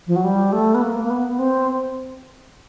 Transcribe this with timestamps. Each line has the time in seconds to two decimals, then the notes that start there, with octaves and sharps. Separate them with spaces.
0.07 F3
0.16 F#3
0.24 G3
0.52 A3
0.75 B3
0.82 A#3
1.04 A#3
1.10 B3
1.28 B3
1.39 C4